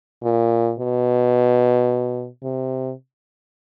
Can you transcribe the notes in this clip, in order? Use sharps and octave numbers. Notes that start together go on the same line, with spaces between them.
A#2
B2
C3